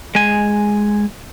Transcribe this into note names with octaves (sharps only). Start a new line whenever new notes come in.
G#3 G#5